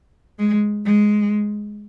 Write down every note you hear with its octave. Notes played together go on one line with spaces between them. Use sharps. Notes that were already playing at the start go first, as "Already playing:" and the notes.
G#3
G#3